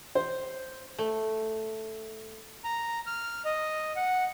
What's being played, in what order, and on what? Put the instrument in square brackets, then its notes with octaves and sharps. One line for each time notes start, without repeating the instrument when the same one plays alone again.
[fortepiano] C5
[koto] A3
[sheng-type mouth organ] A#5
F6
D#5
F#5